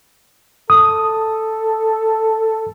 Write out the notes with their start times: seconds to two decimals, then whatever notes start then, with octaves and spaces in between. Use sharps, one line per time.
0.70 A4 D#6